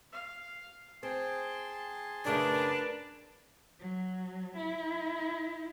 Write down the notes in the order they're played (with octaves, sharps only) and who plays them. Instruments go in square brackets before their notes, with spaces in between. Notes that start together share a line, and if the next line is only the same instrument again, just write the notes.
[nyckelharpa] F5
[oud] C4 [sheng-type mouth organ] G#4 A5 C6 [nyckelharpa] G5
[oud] F#2 C#3 A3 [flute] D4 [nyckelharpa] A#4 B4
[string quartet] F#3
E4